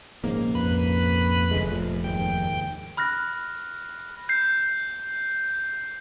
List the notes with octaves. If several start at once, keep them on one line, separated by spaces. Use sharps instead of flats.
A#1 G#2 C#3 A#3
F2 B4 B5
F1 B1 D3 G#3
A#1 F3 A3
D#2 G#2 D#3 G5
B5 F6 F#6 A#6
G6 C7